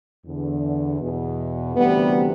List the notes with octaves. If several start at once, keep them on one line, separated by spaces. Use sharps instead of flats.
E2 D3
E2 B2
D2 C3 E3 G3 B3